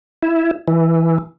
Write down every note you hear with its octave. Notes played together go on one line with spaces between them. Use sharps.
E4
E3